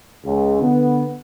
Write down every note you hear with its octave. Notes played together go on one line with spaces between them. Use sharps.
C#2
D3 B3